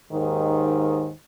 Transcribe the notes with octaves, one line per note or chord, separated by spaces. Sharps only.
D#2 G#2 D#3